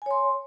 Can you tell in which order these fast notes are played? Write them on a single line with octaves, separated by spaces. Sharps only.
G#5 C#5 C6